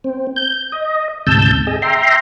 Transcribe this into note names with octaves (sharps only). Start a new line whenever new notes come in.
C4
G6
D#5
D2 G#2 C3 A5 E6 G6
G#4 D#5
E5 G5 A#5 C6